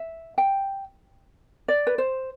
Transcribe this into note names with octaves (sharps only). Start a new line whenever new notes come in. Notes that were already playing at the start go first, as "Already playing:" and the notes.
Already playing: E5
G5
D5
B4
C5